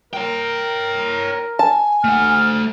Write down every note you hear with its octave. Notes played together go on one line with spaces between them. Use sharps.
A#4 C#5 G5
G#5 A5
A3 F#5 F6